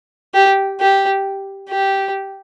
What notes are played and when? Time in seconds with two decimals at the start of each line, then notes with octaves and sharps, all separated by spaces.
0.34 G4
0.80 G4
1.69 G4